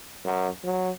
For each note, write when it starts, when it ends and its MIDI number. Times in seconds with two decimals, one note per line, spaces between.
0.24 0.48 42
0.64 0.90 54